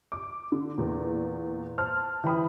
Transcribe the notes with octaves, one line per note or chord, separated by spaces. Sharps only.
D6
D3
E2 A#2
C5 A5 F6
E3 G5 B5 D#6